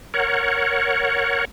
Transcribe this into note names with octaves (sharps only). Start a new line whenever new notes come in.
A#4 C#5 F#5